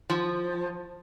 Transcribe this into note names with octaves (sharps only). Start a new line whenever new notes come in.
F3